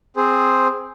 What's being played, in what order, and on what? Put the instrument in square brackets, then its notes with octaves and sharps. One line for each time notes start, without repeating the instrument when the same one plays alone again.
[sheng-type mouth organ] C4 G#4 C5